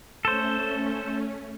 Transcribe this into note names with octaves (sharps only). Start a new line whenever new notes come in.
A3 C#4 A4 C5